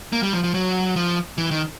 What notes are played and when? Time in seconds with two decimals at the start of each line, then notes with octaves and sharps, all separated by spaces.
0.12 A#3
0.23 G3
0.33 F3
0.43 F3
0.54 F#3
0.96 F3
1.38 E3
1.51 D#3